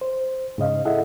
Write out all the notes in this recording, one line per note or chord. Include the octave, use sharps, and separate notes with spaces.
C5
G#2 C#3 D#5 F5
E4 G#4 A4 D#5 E5 F#5